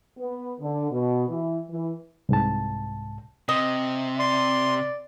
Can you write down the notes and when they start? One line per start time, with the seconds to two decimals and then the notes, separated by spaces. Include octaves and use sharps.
0.19 B3
0.61 D3
0.91 B2
1.29 E3
1.70 E3
2.29 C2 G#2 A5
3.49 C3 D#5
4.19 D5 C6